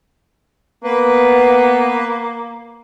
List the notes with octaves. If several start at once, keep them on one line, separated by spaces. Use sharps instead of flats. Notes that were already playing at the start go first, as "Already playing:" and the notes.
A#3 B3 B4